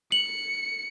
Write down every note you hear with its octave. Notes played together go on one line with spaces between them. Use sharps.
C#7 F#7